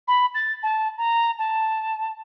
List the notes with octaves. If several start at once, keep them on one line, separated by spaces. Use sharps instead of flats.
B5
A6
A5
A#5
A5